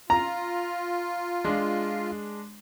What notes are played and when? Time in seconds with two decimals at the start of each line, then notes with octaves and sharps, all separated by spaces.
0.10 F4 A#5
1.45 G#3 D4